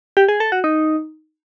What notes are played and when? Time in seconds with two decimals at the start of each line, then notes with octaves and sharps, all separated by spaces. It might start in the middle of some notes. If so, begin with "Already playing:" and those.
0.17 G4
0.29 G#4
0.40 A4
0.52 F#4
0.64 D#4